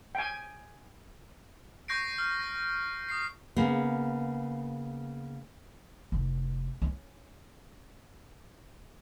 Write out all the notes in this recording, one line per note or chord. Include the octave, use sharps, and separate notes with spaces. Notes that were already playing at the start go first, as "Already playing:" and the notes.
G5 G#5
C#6 G6 A#6 C7 D7
F6
A#6
D#6 C7
C#3 A#3 B3
F1
C#4